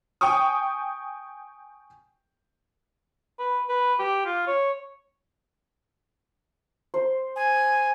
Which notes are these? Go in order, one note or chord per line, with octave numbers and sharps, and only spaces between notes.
G5 G#5 C#6 D#6
B4
B4
G4
F4
C#5
C5
G#5